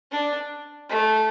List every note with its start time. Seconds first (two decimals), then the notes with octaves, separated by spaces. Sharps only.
0.12 D4
0.89 A3